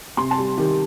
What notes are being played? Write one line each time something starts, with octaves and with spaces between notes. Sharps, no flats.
C3 C6
A5
G3
D#3 G4